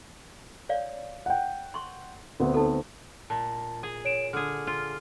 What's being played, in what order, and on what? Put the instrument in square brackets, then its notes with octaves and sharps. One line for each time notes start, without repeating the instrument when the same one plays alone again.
[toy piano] C#5 D5 F5
[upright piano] F#5 G5
[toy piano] C6 C#6
[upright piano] D2 B3 C4
[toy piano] D#4 A4
[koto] A#2 [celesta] A5
[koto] G#4
[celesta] C#5 D7 E7
[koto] D3 G#4 [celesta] F6
[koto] F4